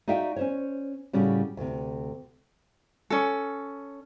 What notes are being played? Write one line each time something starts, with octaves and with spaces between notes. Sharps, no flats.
D#4 F#4 D5 E5 F5 G5
C#4 C5 C#5
A2 C#3 G3 C#4 F#4
D2 C3
C#4 A4